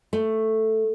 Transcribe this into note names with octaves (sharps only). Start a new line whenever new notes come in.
A3